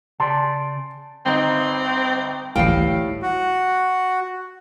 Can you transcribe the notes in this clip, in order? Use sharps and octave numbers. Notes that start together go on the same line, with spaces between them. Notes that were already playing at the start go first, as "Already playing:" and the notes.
C#3 D5 A5 C6
G1 C4 D#4
G1 C#2 A2 E3 G3 F5 G5 C7
F#4